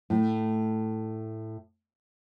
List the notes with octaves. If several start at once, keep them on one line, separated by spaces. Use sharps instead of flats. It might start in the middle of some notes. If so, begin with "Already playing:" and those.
A2 A3